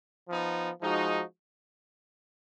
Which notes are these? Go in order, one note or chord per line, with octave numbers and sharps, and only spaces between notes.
F3 B3 D#4
F3 G#3 D#4 F#4